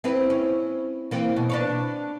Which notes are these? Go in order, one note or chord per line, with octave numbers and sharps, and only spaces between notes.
C4 E4 B4
C#4
E3 A#3 C4
B2
D4 B4 C#5